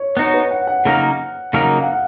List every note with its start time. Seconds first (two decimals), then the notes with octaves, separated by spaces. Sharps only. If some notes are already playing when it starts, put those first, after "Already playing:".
Already playing: C#5
0.17 B3 D#4 F#4 C#5
0.34 B4
0.51 F#5
0.67 F#5
0.85 C#3 F#3 A#3 D#4 A#4
1.53 C#3 F#3 A#3 D#4 A#4 F#5
1.77 F5
1.84 F#5
1.92 F5